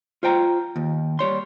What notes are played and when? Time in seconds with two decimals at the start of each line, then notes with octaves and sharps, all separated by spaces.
0.23 F4 C5 G5 A#5
0.76 D#2
1.19 G3 C#5 C6